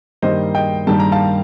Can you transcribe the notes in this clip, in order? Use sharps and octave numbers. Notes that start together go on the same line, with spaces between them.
G2 D#3 G3 A#3 C5 D#5
D#5 G5
G2 D#3 G3 A#3 A5
A#5
F5 A5